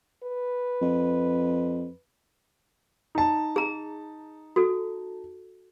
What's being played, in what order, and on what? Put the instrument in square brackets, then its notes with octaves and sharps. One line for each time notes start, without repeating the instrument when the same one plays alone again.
[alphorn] B4
[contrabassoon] F2
[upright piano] D#4 A5
[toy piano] G#4 A#5
F#4 A4